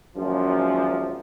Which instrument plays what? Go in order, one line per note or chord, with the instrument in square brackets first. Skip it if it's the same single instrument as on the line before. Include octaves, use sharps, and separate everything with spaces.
[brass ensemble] G#1 F#2 A#2 F3